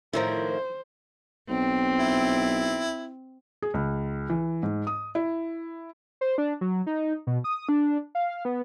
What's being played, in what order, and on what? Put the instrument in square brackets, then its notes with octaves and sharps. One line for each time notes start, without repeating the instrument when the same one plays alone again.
[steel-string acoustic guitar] A2 D#3 F3 [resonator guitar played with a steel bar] E4 A#4 [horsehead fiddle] C5
[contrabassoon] B1 [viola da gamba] C4
[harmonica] E4
[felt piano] G#4
C#2
E3
G#2
D#6
E4
[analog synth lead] C5
D4
F#3
D#4
B2
D#6
D4
F5
B3